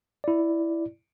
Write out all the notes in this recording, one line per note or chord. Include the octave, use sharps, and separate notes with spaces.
E4 D5